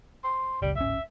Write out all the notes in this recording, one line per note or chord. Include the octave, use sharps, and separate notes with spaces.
C5
F#1 C#2 G3
D1 G#1 C#4 E5